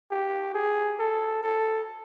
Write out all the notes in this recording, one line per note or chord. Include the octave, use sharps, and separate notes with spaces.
G4
G#4
A4
A4